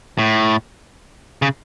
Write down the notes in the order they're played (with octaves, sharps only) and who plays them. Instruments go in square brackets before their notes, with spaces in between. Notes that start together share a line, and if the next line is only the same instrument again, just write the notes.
[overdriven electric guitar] A2
C#3